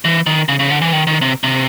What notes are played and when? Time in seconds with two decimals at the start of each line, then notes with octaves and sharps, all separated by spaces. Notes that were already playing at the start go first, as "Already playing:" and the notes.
0.05 E3
0.26 D#3
0.49 C#3
0.59 C#3
0.70 D3
0.82 E3
0.93 D#3
1.07 D#3
1.21 C3
1.44 C3